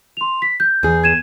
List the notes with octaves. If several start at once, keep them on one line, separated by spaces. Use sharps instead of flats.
C6 F7
B6
G6
E2 G#4
G#6 D#7 E7